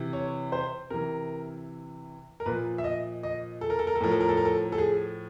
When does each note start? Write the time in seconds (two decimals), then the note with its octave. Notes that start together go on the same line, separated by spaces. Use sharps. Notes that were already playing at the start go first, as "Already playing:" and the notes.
Already playing: C3 E3
0.13 C#5
0.52 C5
0.90 C3 E3 A#4
2.40 A#4
2.46 A#2 F3 B4
2.78 E5
2.84 D#5
3.23 D#5
3.61 A4
3.70 A#4
3.79 A4
3.87 A#4
3.96 A4
4.01 A2 F3 A#4
4.12 A4
4.20 A#4
4.29 A4
4.37 A#4
4.45 A4
4.72 A4
4.78 G#4